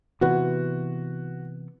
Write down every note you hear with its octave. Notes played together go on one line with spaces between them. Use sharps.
C3 E3 B3 F#4